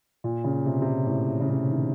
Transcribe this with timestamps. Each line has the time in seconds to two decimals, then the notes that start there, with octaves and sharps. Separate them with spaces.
0.24 A#2
0.44 C#3
0.66 C3
0.81 C3
0.87 A#2
1.07 A2
1.41 C#3
1.49 C3
1.69 D#3